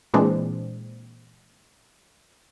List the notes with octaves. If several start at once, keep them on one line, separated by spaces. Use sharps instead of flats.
A#2 E3 G#3 C4 D4